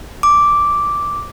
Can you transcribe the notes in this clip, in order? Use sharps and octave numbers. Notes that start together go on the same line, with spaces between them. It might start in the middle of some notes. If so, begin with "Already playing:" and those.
D6